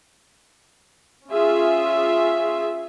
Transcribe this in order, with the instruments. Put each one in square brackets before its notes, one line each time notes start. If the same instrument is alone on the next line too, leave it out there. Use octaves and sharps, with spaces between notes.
[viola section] C#4 F4 G#4 E5